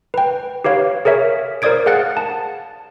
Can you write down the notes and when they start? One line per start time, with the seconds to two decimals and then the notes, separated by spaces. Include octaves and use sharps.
0.14 B4 G5
0.64 G4 B4 C#5 F5
1.05 G#4 A#4 C#5 E5
1.62 A#4 C5 D5 D#6 G#6 D7
1.86 G#4 F5 F#5 F#6 A6
2.17 A5